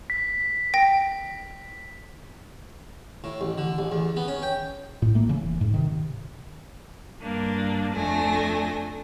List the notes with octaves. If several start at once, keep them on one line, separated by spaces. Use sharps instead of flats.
B6
G5 A#6 B6
A2
A1
D3
A1
E2
B3
C#4
G5
A1 A2
A3 A#3
C#3 E3
D1
G#2
C3 D#3
G2 G3 A#3 D4
F2 A3 D4 A4 G#5 A#6